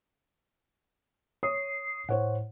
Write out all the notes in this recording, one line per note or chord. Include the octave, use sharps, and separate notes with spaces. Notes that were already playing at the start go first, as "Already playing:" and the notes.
C#5 D#6 C7
A2 C5 C#5 F#5